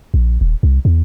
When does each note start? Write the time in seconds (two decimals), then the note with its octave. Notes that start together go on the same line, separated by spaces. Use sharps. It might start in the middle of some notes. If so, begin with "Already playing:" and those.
0.14 A#1
0.41 D#1
0.63 C2
0.85 E2